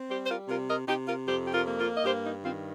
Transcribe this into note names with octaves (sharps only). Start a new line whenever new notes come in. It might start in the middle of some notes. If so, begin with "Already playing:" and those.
Already playing: C4
G3 G4 C5
C5
F4 A#4
C3 F4 A#4
A#4 D#5
C3 D#4 G4
F4 A#4
F2 G4 C5
G4
F4 A#4
A#3
F4 A#4
D#5
G2 G4 C5
D#4
D#3 C4 F4